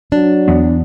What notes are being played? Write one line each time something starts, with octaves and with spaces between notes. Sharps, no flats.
F#3 D4
E2 B3